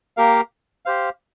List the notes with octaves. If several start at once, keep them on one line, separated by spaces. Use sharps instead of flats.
A#3 G4 A#4 F5
G4 C5 F5